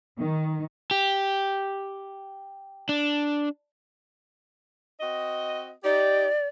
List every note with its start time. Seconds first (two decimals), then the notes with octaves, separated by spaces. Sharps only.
0.18 D#3
0.91 G4
2.89 D4
5.00 C4 F#4 D#5
5.84 D#4 G4 D5